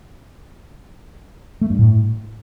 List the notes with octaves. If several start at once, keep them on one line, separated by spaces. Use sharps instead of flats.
A3
G2
A2